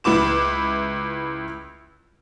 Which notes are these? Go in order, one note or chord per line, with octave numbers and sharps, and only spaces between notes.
C#2 E4 B4 D6 E7